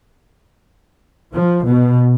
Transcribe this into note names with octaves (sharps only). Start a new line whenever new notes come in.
F3
B2